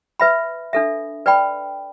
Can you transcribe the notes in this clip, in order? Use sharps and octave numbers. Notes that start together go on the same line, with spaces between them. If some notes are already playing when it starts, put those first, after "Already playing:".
B4 E5 B5
D4 A4 E5
B4 D5 G5 B5